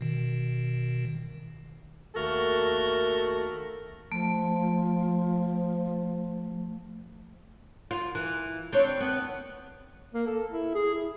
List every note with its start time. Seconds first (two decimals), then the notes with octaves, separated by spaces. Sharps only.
0.01 B2 D#3
2.15 D#2 A3 F#4 A4 A#4
4.12 F3 A3
7.91 F4
8.15 E3
8.73 C4 D4 C#5
9.01 B3
10.14 A#3
10.27 A4
10.52 E4
10.75 G#4
10.95 E4